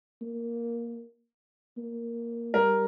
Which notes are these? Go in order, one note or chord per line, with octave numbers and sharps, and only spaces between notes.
A#3
A#3
G3 A#4